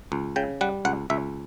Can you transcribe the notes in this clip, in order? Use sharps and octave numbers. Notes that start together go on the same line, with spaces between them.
C#2
C#3 G5
G3 F#5
C#2 F#5
C#2 E5